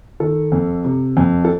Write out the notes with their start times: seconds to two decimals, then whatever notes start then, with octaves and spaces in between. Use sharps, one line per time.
0.20 D#3 A4
0.52 F2
0.85 C3
1.17 F2
1.45 A4